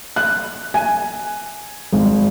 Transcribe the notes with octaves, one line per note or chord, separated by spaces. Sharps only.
F#6
G#5
G#1